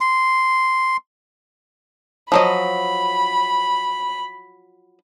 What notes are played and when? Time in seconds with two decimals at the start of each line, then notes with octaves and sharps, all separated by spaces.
0.01 C6
2.32 F3 F#3 D#5 B5